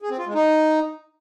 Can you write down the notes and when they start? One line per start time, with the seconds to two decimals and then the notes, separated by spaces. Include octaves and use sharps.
0.02 G#4
0.10 C4
0.18 F4
0.26 G#3
0.34 D#4